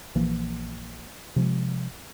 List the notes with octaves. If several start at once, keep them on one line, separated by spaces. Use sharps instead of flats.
A#1 E3 F3 A#3
C3 F3 G3 G#3